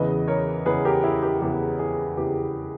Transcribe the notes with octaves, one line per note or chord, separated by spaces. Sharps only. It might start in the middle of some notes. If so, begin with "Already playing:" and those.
Already playing: E2 C#3 E3 B4 D#5
A#4 C#5
E2 C#3 E3 G#4 B4
G4 A#4
E4 G#4
G4 A#4
E2 C#3 E3 G4
E4 G#4
E2 C#3 E3 G4